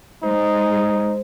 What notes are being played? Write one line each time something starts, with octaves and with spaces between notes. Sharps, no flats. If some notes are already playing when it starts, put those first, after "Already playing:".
G#3 D#4 C5